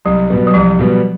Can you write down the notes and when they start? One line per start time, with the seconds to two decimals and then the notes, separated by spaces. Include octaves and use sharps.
0.05 C2 F#3
0.30 B2 G3 B3
0.47 F#3
0.54 C2 F3
0.79 B2 G3 B3